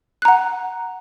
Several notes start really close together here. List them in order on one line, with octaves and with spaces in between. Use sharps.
F#6 A#5 F#5